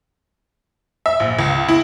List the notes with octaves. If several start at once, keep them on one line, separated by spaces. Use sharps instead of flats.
E5
A#1
C#2
E4